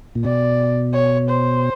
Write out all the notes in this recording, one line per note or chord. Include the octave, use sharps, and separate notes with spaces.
A#2
B2 D5
C#5
C5